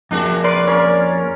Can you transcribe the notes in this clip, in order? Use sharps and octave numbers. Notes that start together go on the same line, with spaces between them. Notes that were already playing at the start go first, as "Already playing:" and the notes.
F2 A#3 D4 F#4 G#4
A#4 B4 D5 C6
C#4 F4 A#4 C#5